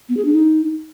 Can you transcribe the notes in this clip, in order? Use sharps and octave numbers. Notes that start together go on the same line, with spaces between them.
B3
G#4
D4
D#4